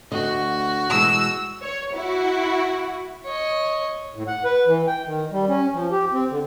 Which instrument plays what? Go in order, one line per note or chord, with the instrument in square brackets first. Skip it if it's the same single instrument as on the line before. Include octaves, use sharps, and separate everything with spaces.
[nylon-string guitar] D2 D3 D#5 [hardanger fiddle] F#4
[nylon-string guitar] B2 E3 G#3 [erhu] E6
[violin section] C#5
E4 F#4
[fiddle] C#5 D#5
[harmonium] A2
F#5
B4
E3
G5
D#3
G3
C#4
F3
G4
C4
D3